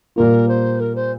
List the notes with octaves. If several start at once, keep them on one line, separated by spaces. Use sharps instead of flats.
A#2 G3 A#3 F4 A#4
C5
A#4
C5